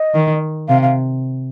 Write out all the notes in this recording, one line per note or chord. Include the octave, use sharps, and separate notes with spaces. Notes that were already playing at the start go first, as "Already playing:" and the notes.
Already playing: D#5
D#3
C3 F5
F5